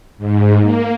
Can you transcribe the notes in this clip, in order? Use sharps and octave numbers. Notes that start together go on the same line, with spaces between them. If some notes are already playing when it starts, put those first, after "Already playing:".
G#2
A#3